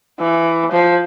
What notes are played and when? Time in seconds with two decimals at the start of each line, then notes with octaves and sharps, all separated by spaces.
0.19 E3
0.71 F3